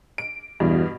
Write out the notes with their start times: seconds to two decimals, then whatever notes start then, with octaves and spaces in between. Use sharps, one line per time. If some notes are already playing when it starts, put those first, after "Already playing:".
0.18 D7
0.60 E2 G2 B2